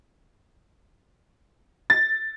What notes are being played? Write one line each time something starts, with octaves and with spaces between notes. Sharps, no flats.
A6